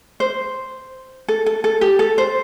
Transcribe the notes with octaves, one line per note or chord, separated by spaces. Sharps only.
C5
A4
A4
A4
G4
A4
C5